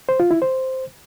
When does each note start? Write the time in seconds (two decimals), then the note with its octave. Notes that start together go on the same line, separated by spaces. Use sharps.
0.09 C5
0.20 F4
0.31 E4
0.42 C5